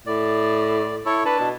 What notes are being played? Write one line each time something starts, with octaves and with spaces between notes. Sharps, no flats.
A2 D5
E4 A4 C#5
D4 B4 A5
B2